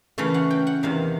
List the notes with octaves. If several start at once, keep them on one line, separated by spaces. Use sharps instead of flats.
C#3 E3 A3 C#4 F5
F#5
G5
F#5
E2 C3 D#3 F5